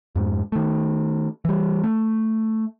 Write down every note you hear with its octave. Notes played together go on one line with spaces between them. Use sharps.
F2 G#2
D#3 A3
E3 G3
A3